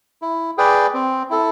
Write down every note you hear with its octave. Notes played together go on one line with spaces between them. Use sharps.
E4
G#4 B4 D5 G5
C4
E4 A4